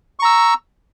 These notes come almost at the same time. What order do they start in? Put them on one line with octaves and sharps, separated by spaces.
C#6 A#5 E6